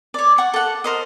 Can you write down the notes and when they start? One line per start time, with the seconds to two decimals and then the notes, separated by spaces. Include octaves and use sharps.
0.14 C#5 D5
0.38 F#5 C#6
0.54 A4 F#5
0.84 A#4 C5 D#5